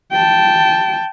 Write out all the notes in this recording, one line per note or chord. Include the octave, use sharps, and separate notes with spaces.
G5 A5